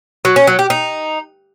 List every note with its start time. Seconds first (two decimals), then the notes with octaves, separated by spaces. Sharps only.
0.25 F#3
0.36 C#4
0.47 F#3
0.59 G4
0.70 D#4